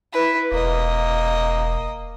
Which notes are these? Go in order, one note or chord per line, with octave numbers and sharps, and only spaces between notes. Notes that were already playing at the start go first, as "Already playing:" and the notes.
E4 B4
E1 A#3 D#5